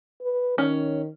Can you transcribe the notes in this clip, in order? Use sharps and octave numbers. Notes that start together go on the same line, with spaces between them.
B4
D#3 C#4